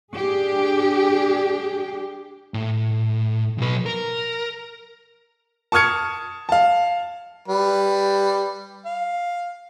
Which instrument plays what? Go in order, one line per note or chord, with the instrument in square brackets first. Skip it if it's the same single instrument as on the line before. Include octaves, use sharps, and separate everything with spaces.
[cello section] D4 G4 G#4
[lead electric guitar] A2
B1 B4
A#4
[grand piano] A5 C#6 D#6 F6 G#6 C#7
F5 A5
[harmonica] G3 B4
F5